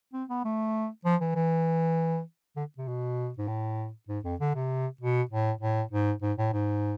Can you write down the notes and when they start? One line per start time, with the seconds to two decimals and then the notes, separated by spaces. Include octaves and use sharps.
0.13 C4
0.29 B3
0.45 A3
1.05 F3
1.21 E3
1.36 E3
2.56 D3
2.78 C3
2.88 B2
3.38 G#2
3.48 A2
4.09 G#2
4.25 F2
4.40 D3
4.55 C3
5.01 B2
5.31 A2
5.61 A2
5.91 G#2
6.22 G#2
6.38 A2
6.53 G#2